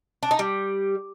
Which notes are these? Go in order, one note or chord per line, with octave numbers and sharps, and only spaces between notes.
D4
D#4
G3